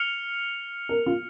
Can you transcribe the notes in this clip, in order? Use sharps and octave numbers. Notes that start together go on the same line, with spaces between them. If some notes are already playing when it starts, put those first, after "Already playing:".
Already playing: F6 C#7 F7
A#4
F4